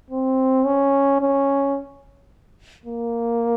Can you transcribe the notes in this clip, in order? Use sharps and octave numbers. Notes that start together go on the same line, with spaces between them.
C4
C#4
C#4
A#3